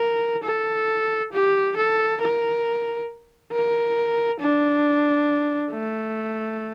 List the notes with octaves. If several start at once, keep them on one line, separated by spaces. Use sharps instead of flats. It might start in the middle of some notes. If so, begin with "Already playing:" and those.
Already playing: A#4
A4
G4
A4
A#4
A#4
D4
A3